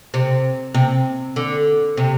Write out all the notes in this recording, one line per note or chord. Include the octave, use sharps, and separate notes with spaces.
C3
C3
D3
C3